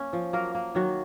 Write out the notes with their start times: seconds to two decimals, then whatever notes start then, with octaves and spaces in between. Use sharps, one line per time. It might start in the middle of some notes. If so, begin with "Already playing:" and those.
Already playing: A#3 C#4
0.13 F3
0.33 F#3 A#3 A#4
0.55 A#3
0.75 D#3 F#3 F#4